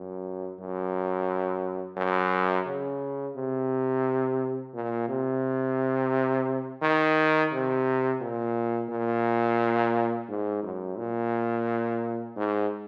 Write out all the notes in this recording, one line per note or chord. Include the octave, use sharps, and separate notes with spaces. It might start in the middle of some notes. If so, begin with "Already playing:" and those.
Already playing: F#2
F#2
F#2
C#3
C3
A#2
C3
D#3
C3
A#2
A#2
G#2
F#2
A#2
G#2